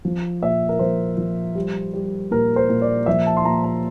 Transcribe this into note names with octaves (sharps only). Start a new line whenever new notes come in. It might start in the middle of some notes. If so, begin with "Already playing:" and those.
F3
A#2 E5
A#4
F3 C5
F3
G3
G3
A#2 A#4
C5
A#2
D5
F3 E5
A5
C6
A#2 A#5
A#5